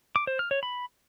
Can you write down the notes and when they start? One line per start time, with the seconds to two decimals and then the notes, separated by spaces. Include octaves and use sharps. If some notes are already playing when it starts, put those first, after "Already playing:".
0.16 D6
0.27 C5
0.39 F6
0.51 C#5
0.63 B5